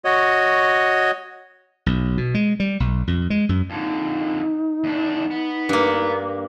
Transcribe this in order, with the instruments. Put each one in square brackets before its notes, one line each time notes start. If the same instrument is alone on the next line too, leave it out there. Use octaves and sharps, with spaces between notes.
[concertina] F#4 C#5 D#5
[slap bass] B1
B2
G#3
G3
B1
F2
G#3
F#2
[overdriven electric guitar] F2 D3 [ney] D#4
[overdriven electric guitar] E2 D4
B3
[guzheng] G2 A#3